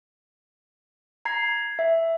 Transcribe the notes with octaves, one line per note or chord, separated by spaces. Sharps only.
A#5 G#6 C7
E5